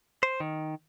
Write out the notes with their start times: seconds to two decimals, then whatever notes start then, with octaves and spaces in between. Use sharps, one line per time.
0.23 C5
0.40 D#3